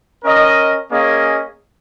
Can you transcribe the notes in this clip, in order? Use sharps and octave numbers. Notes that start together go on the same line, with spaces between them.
C#4 A#4 D#5
A#3 C#4 G#4 D#5